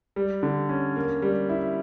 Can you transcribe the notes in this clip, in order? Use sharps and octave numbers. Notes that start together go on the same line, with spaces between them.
G3
D3
C#4
A#3
G3
E4